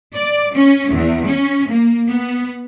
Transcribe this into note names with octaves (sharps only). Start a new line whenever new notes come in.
D5
C#4
E2
C#4
A#3
B3